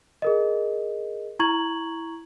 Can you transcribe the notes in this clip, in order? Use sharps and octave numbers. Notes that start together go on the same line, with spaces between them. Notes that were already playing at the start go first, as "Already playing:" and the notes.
G#4 A#4 D#5
E4 A#5 C#6 G#6 F#7